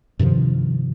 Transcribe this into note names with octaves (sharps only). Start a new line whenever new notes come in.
G2 C3 D#3 F3